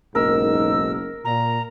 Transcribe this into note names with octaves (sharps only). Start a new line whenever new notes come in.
F#1 B1 G#2 D#4 A#4 E6
A#2 A#5